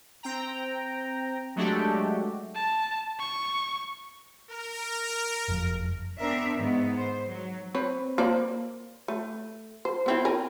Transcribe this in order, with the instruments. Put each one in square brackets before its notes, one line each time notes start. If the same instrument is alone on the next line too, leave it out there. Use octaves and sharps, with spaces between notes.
[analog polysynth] C4 G5 A#5
F#3 G#3 A3 D4 F#4 G4
[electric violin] A5
C#6
[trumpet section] A#4
[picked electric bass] F#1 F2
[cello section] B3 C4 D4 A#4 E5
G#2 D#3 B3
C5
F#3
[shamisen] C4 B4 C#5
A#3 C5 D5
A3
C5
B3 C4 E4
A#4 G#5